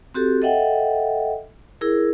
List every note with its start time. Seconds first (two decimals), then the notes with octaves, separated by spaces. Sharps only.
0.14 C4 F#4 G4 A4
0.42 A4 D#5 E5 F#5 G5
1.81 E4 G#4 A#4